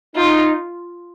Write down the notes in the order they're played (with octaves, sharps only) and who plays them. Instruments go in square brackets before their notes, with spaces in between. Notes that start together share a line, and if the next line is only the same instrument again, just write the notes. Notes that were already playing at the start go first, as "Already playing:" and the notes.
[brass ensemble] D#4 [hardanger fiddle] F4